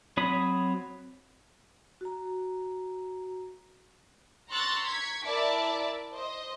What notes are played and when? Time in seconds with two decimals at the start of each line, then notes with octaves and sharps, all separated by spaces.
0.17 F#3 C4 C#5 B5 D#6
2.01 F#4 A#5
4.50 A#5 C6 C#6 E6 F#6 A6
4.87 C#6 G#6 B6
5.25 E4 A#4 D5 E5 A5 D6
6.14 C5 D#5